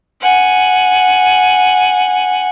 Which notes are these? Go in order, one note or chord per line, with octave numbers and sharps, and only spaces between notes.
F#5 G#5